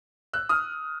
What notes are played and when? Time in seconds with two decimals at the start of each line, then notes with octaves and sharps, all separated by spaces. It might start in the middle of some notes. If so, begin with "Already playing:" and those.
0.33 E6 F#6
0.49 D#6 F6